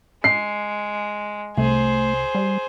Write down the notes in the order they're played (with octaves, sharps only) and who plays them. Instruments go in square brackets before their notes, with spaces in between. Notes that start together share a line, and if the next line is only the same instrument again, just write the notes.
[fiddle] G#3 [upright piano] C7
[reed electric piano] C2 [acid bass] A3 [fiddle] G#4 C5
[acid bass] G3